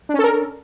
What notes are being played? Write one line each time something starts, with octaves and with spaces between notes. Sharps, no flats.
C#4 D4 A4 A#4